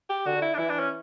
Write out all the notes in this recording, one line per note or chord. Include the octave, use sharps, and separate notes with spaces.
G4
D3 F#4
E4
D4
E3 E4
D4
C#4